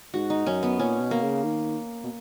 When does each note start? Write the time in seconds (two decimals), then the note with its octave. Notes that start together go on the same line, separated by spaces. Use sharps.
0.14 G#2 F#4
0.30 D#4
0.46 F#2 C#4
0.63 B3
0.79 A#2 C#4
1.00 B2
1.11 A#3
1.22 C#3
1.44 D#3
2.04 B2